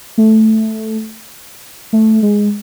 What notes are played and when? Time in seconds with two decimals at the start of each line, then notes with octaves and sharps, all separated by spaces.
0.18 A3
1.93 A3
2.22 G#3